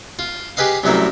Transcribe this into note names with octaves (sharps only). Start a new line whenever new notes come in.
F4
G4 G#4 B4 D#5 F5
C2 F#2 F#3 A3 A#3